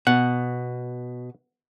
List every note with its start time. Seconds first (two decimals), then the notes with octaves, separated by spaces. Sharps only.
0.07 B2 F#5